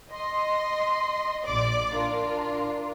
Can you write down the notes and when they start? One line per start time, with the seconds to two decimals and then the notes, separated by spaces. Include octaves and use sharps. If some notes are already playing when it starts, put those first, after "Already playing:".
0.11 D#5 C6
1.45 A#1 D5 D6
1.95 D4 F4 A#4